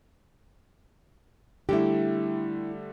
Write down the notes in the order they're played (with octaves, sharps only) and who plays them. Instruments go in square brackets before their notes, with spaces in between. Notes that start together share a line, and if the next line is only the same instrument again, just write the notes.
[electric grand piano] D3 G3 A3 [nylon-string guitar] E4 G4